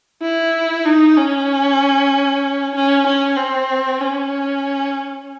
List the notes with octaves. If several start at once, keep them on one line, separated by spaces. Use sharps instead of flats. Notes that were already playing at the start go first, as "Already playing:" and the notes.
E4
D#4
C#4
C#4
C#4
C4
C#4